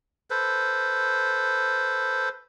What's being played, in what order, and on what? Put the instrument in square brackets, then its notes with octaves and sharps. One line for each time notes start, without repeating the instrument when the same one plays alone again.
[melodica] A4 B4 C5